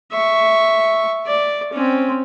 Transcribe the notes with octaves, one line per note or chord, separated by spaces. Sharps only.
E5 C#6
D5
C4 C#4